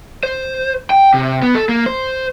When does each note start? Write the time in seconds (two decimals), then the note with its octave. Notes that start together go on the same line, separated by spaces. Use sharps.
0.23 C5
0.90 G5
1.14 C3
1.42 B3
1.55 A4
1.69 A#3
1.86 C5